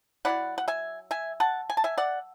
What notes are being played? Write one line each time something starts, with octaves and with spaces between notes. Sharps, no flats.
F#3 C#4 E4 D5 F#5
F#5
E5 G#5
E5 G#5
F#5 A5
G#5
A5
E5 G#5
D5 F#5